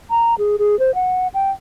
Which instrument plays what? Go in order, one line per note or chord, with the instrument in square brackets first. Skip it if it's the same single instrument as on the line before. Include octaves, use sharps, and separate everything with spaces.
[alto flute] A#5
G#4
G#4
C5
F#5
G5